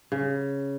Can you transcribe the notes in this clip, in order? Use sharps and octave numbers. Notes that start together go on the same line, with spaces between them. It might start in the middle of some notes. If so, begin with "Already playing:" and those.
C#3